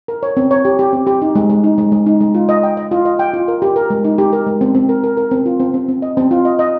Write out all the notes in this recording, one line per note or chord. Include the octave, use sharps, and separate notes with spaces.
A#4
C#5
C4
C#5
G4
G4
C4
G4
D#4
G#3
G#3
D#4
G#3
G#3
D#4
G#3
F4
D#5
G5
D#5
F4
D#5
G5
F4
A#4
G4
A#4
G#3
D#4
G4
A#4
G#3
C4
C4
A#4
A#4
A#4
C4
F4
C4
C4
C4
D#5
C4
F4
D#5
D#5